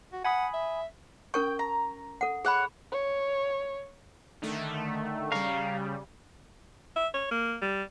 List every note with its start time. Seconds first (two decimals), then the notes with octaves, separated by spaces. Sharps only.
0.13 F#4
0.24 F#5 G#5 B5 D#6
0.54 E5
1.34 C#4 A#4 G5 C#6
1.59 A#5
2.21 A4 F#5
2.45 G#4 C#5 F#5 B5
2.92 C#5
4.42 D3 D#3 A3
5.32 C#3 G3 F5 A#5 C#6
6.96 E5
7.14 C#5
7.31 A#3
7.62 G3